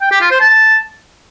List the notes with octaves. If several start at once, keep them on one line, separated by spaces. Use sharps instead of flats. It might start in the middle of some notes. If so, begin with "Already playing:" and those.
G5
G4
F4
C5
A5